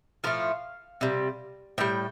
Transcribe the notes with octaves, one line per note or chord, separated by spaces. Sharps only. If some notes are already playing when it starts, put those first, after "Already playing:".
A2 F3 A3 F5
C3 G3
A2 G3 G5